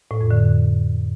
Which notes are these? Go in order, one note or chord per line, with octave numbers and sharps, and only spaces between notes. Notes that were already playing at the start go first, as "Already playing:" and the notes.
A2
F2
D3